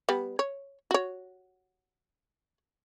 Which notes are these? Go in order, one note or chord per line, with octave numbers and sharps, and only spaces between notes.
G3 B3
C#5
F#4 C#5